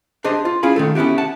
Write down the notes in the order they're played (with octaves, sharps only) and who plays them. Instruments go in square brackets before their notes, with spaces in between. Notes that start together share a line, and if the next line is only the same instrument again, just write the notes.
[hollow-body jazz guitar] D4 G4 G#4 C5 D#5
F4
C#4 E4 F4 G#4 B5
D#3 A3 A4
B3 C#4 E4 F#4 G4
F#5 A5